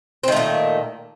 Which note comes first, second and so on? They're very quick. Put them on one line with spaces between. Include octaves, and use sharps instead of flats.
C4 D#3 A3 A#2